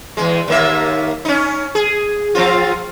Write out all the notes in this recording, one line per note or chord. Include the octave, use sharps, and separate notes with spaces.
E2 G2 G#3
D#2 A#3 E5
C#4 D#4
G#4
F3 C4 F4